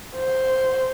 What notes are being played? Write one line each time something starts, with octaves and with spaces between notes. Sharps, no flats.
C5